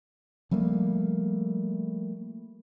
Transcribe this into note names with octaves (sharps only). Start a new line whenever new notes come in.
F3 G3 A3 A#3